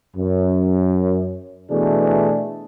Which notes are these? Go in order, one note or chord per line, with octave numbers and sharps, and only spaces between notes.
F#2
B2 E3 A3 D4 G#4